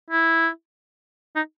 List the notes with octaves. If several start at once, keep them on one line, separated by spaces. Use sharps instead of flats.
E4
D#4